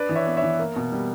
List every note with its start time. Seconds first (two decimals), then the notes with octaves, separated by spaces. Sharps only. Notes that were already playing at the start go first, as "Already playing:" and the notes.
Already playing: D4 B4 D5
0.09 E3
0.15 C#5 E5
0.27 B3
0.37 C#5 E5
0.43 E3
0.59 A#3
0.76 B2
0.92 G3